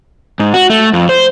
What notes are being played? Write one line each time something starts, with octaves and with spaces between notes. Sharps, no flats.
G#2
F#4
A3
F2
C5